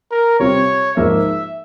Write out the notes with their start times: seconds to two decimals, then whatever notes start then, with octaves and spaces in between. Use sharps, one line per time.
0.11 A#4
0.39 C3 G3 C4 F4 C#5
0.97 G#2 F3 A#3 E5